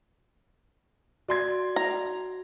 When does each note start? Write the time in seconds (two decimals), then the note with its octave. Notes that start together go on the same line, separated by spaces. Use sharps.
1.28 F#4 D5 C6 G#6
1.76 A#5